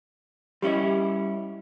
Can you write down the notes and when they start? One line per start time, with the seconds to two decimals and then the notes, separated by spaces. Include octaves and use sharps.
0.62 G3 C#4 E4 G4 D#5